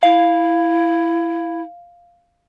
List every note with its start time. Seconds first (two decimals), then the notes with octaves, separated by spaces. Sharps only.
0.03 E4 F5